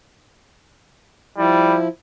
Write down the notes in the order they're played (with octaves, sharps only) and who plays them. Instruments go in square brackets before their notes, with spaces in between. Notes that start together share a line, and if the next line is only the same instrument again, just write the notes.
[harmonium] F3 E4 [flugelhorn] G3